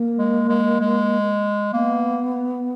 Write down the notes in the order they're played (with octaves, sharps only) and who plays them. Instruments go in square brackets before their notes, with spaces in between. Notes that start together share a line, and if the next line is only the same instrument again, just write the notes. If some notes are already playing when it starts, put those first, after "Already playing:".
Already playing: [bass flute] A#3
[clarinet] G#3
G#3
G#3
[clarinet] A#3 [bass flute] B3